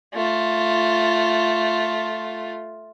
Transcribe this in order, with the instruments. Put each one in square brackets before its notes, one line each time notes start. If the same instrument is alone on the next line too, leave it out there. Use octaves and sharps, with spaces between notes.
[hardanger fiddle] A3 F4